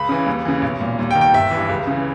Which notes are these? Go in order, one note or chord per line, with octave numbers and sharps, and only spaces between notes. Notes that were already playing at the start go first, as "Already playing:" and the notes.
Already playing: C#2 B5
C#3 E3
D#2
C#3 E3
B1
A#2
D#2
G5
D#3
G5
G1 E5
G2 E3
C#2
C#3 E3